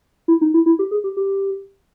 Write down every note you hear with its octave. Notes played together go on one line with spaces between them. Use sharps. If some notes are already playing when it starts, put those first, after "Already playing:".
E4
D#4
E4
E4
G4
G#4
G4
G4